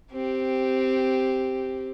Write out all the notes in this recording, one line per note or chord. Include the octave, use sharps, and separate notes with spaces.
C4 G4